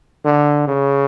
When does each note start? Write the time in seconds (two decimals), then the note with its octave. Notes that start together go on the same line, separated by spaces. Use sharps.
0.25 D3
0.68 C#3